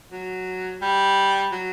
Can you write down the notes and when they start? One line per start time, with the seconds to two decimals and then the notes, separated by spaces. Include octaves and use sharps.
0.12 F#3
0.82 G3
1.52 F#3